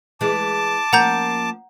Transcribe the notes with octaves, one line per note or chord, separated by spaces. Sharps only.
E3 G#3 A5 D6
F3 A#3 C#4 F#5 A#5 G6